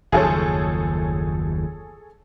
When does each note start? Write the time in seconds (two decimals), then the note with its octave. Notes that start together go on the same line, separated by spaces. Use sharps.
0.12 F#1 D#2 F3 G#4 A4 C#5